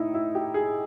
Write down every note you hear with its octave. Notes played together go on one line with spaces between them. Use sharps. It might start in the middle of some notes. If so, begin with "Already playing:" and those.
Already playing: A2 D#4 E4
E4
G4
G#4